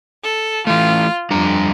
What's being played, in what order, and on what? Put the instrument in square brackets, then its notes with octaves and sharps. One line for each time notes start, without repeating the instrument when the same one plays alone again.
[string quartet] A4
[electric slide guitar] E3 A3 [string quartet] F4
[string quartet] F2 [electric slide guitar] G3 D4 A#5